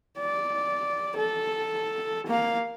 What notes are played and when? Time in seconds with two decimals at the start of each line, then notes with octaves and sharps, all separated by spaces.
0.19 D5
1.17 A4
2.27 A#3 F5